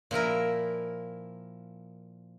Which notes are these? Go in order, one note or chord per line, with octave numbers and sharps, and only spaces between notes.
A#2 F3 E4 A#4